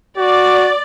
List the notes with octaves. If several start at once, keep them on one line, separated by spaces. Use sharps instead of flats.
F#4 D5